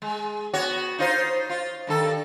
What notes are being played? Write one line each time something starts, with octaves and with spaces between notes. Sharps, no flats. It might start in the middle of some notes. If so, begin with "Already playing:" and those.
G#3
B3 F#4 C#5
D#4 F4 C5
F4
G2 D#3 A4